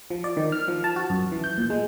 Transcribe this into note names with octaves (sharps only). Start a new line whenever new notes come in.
F3
D5
D#3
F6
F3
A5
F#4
F#2
E3
G6
A#2
G#3